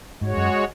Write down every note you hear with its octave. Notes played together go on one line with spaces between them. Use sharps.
G#2 G#3 F#4 C#5
F#2